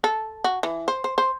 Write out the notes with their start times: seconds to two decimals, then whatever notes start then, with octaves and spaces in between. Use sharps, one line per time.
0.04 A4
0.44 F#4
0.63 E3
0.88 C5
1.04 C5
1.18 C5